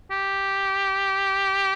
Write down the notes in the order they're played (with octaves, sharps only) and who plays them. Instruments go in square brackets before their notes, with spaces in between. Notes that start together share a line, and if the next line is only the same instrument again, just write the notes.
[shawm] G4